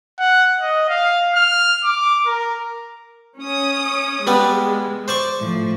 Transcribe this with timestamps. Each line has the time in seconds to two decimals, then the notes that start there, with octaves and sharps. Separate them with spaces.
0.19 F#5
0.60 D#5
0.89 F5
1.35 F6
1.84 D6
2.26 A#4
3.39 C#4 D#6
4.27 G3 G#3 B3 D5
5.08 C5 D5 C#6
5.40 A2 F3